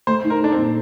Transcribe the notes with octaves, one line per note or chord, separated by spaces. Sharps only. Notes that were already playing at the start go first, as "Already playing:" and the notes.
A3 C5
D#4
A#4
D4 A4
C4
A#2